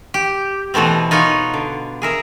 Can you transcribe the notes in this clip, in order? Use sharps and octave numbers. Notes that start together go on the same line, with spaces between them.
G4
B2 E3 A3 B3 C4
D#4 F4 C#5 F#5 G#5
D3
G#4 A#4 E5